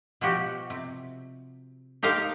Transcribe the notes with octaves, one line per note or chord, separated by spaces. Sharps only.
B2 F3 F#4 G4
C3
D#4 G4 A#4 C5 F5